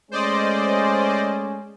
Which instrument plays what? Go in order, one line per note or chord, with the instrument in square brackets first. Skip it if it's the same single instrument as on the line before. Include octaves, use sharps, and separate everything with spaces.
[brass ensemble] G#3 A3 C#4 [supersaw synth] C5 D5 D#5